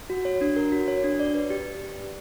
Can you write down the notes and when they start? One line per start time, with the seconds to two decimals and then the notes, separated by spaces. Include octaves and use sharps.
0.10 F#4
0.25 C#5
0.41 D4
0.56 A#4
0.72 F#4
0.88 C#5
1.04 D4
1.19 D5
1.34 B4
1.50 G4